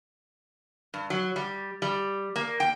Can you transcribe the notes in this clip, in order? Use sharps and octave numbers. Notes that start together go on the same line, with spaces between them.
G2
F#3
G3
G3
A#3
G5